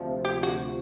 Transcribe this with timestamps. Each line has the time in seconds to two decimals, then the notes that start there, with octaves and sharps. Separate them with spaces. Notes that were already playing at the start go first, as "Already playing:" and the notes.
Already playing: D2 C3 F3
0.25 G4
0.43 F#4